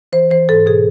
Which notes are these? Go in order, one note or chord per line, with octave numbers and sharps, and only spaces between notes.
E3 C5
E3 C5
G#2 A4
B2 G#4